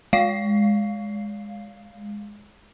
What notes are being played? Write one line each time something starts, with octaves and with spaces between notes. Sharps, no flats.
G#3 F5 C7